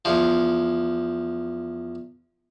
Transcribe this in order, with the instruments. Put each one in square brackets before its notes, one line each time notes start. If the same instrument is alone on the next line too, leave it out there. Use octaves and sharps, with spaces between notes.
[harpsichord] E2 F3